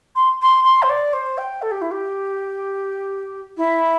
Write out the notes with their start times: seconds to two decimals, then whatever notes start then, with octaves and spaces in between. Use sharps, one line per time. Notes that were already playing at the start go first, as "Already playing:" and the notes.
0.16 C6
0.42 C6
0.64 C6
0.82 C5
0.89 D5
1.13 C5
1.38 G5
1.62 A4
1.71 G4
1.81 E4
1.91 G4
3.57 E4